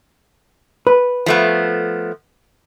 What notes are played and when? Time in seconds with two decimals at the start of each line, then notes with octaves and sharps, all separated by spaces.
0.87 B4
1.26 F3 A3 B3